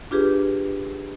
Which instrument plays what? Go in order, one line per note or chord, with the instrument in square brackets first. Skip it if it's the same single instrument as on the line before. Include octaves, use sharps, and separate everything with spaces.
[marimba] D4 F4 G4 G#4 B4